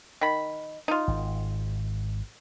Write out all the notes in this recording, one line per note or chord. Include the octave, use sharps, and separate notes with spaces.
D#3 B5
D#4 F4
G#1